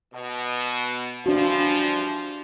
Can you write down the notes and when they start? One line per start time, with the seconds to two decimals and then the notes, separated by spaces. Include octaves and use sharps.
0.14 B2
1.26 E3 F3 G3 D4 F#4